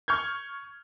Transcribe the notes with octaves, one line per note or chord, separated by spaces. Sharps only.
C#6 F6 G6 G#6